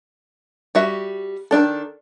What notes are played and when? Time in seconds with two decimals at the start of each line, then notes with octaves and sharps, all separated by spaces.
0.75 G3 F#4 E5
1.51 D#3 G#3 D4 A4